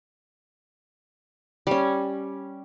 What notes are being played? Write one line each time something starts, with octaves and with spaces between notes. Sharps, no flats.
G3 C#4